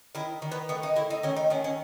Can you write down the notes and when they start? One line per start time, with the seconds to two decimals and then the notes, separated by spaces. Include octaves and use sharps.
0.15 D#3 E4
0.42 D#3
0.52 B3
0.69 A3 B3
0.83 D#4
0.96 A3 E4
1.10 D#4
1.23 D#3 C#4
1.36 D#4
1.50 D#3 C#4
1.64 C#4